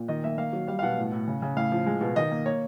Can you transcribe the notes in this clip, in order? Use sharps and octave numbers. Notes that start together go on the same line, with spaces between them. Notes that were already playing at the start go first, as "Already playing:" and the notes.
Already playing: A#2
D#3 D#5
A#3 E5
A#3 F5
F#3
G3 F5
F5
B2 F#5
A2
A2
C#3
C#3
A2 F5
F3
G#3
B2
D#3 D#5
A#3
A#3 C#5